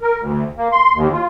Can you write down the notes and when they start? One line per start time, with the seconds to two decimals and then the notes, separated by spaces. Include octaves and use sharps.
0.01 A#4
0.20 D2
0.58 A#3
0.72 C6
0.95 D#2
1.13 F4